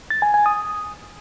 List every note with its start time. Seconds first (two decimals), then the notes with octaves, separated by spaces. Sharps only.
0.10 A6
0.22 G#5
0.34 G#5
0.46 D#6